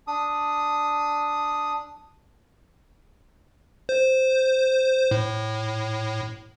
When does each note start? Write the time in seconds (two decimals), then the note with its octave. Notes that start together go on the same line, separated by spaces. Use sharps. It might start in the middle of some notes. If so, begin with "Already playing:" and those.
0.07 D4 D#6
3.89 C5
5.11 A2